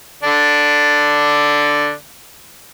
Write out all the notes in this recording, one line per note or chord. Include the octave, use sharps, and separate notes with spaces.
D3 D4